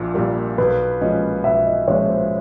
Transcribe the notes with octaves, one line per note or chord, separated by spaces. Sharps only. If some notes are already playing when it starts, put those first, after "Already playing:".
Already playing: A#1 A#2
A#2 G3 A#4
B1 B4
A#2 F3 G#3 C#4 D#5
B1 E5
D#5
A#2 F3 G#3 C#4 C#5
C5